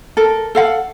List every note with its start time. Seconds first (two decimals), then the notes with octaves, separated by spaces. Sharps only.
0.17 A4 A#4
0.55 A4 F5 F#5